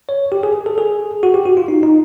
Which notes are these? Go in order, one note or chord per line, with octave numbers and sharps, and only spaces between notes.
C#5
G4
G#4
A4
G#4
F#4
G4
F#4
F4
D#4
D#4